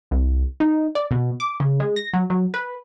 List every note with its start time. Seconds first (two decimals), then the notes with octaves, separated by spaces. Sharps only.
0.11 C2
0.60 D#4
0.95 D5
1.11 B2
1.40 D6
1.60 C#3
1.80 G#3
1.96 A#6
2.13 F#3
2.30 F#3
2.54 B4